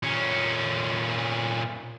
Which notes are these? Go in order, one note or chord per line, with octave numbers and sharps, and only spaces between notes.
A#2 C#4